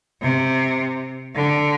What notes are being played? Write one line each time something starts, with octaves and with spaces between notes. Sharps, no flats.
C3
D3